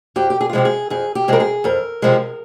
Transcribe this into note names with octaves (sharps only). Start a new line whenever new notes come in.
F2 G4
G4
G#4
F4
C3 F3 G#3 G4
G#4
F2 G#4
G4
C3 F3 G#3 A#4
G#4
F2 A#4
C3 F3 G#3